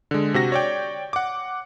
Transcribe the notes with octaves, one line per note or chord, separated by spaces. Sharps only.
D3 G#3
C3 F#4 A#6
C#5 D5 G5
F#5 D6